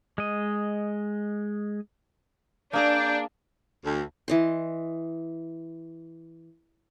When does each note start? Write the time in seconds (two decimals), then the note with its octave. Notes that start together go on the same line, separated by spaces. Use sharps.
0.18 G#3 D#5
2.73 A#3 D4 G#4 A#5 G6
3.85 D2
4.28 E3 D#5 C6